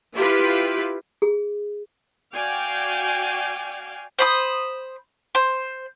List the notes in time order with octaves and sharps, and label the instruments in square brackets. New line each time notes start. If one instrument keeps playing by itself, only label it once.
[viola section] E4 F4 G4 B4
[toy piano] G#4
[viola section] F#4 D5 F5 G5 G#5
[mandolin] C5 B5 D#6
C5